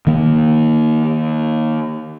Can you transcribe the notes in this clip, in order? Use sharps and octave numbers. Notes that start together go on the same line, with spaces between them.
D#3 A#3